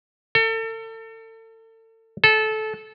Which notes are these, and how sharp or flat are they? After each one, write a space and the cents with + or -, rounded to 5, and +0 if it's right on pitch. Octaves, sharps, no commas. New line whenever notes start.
A4 +35
A4 -20